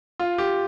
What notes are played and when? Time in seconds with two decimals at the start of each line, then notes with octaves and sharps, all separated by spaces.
0.19 F4
0.38 G4